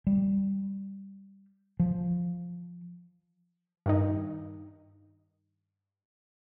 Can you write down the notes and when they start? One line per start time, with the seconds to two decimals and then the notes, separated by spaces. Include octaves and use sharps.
0.07 G3
1.80 F3
3.86 G2 D#3 D#4